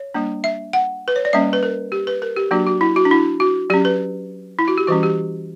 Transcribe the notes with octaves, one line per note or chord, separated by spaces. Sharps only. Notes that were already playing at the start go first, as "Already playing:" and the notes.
Already playing: C#5
G3 A#3 D4
E5
F#5
B4
C#5
D5
G3 A#3 C#4 E5
B4
A#4
G4
B4
A#4
G4
F#3 A#3 D4 F#4
F#4
E4
F#4
D4
E4
F#4
F#3 C#4 G4
B4
E4
F#4
G4
E3 G3 C#4 F#4
G4